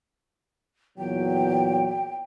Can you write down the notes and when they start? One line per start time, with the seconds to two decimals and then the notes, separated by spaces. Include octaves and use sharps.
0.98 E2 A#2 F#3 G5